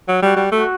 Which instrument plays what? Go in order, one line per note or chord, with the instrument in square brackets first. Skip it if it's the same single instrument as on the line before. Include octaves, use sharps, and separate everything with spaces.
[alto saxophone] F#3
[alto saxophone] G3 [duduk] F#4
[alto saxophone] G3
[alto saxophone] A3 [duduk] F#4